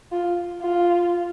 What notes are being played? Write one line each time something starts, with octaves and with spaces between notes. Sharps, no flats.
F4
F4